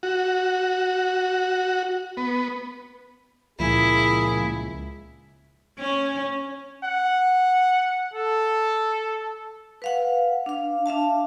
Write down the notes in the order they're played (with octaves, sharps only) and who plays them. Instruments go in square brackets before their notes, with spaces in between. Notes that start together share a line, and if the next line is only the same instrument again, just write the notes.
[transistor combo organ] F#4
B3
[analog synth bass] C#2 [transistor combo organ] A#2 F3 [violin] E4 [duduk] G#4
[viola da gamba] C#4
[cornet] F#5
A4
[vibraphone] B4 F5 F#5
D4 F5
D4 E5 F5 A5